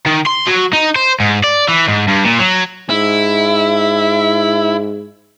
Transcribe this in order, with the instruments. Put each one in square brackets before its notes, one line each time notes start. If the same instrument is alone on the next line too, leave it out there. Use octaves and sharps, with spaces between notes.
[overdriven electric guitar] D#3
C6
F#3
D#4
C5
G#2
D5
E3
G#2
G2
A#2
F#3
[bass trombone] G#2 [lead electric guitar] E4